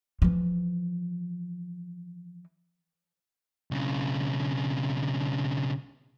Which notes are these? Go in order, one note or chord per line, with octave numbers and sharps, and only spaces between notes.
E3 F3
B1 C#3